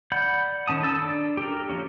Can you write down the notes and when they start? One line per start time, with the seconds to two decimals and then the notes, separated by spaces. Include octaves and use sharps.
0.12 D5 F#5 B5 G6
0.67 D#3 C#4 A5 D#6
0.83 A4 A5 E6
0.99 D4
1.37 G4 A4 A#4
1.69 F3 G#3 A#3 C#4